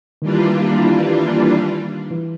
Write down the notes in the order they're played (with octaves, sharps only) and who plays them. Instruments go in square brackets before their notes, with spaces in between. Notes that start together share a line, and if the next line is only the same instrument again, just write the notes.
[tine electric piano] D#3 [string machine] E3 G3 A#3 D4 F4
[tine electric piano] E3